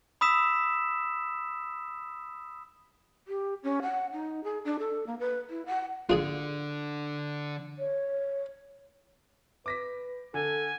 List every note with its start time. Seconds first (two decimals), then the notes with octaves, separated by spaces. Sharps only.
0.21 B5 D#6 E6 B6 E7
3.28 G4
3.63 C#4
3.82 F#5
4.13 D#4
4.44 G#4
4.65 D4
4.79 A4
5.07 A#3
5.20 B4
5.50 E4
5.66 F#5
6.09 D3 D4 F4 G#4 G#5
7.79 C#5
9.66 B4 D6 A#6 B6
10.34 D3 A4 G#5